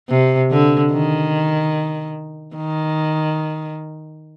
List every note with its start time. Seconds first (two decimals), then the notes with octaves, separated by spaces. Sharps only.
0.09 C3
0.51 D3
0.92 D#3
2.56 D#3